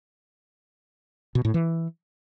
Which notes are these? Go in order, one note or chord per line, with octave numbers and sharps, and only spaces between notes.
B2
A2
E3